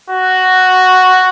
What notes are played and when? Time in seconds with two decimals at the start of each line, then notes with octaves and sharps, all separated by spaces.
0.10 F#4